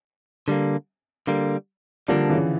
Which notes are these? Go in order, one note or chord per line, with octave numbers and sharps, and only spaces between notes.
D3 G3 A#3
D3 G3 A#3
D3 F3 G3 A#3 D4
C#3 E3